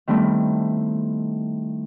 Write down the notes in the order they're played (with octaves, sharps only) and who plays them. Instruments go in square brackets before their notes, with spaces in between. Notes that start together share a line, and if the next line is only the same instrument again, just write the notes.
[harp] D#3 G3 A3 B3 C4 E4